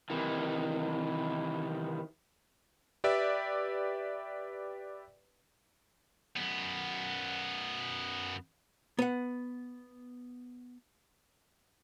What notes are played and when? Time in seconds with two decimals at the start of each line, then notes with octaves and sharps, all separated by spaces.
0.10 C3 D#3 E3
3.04 G4 B4 D5 E5
6.36 F#2 B3
8.99 B3 F#5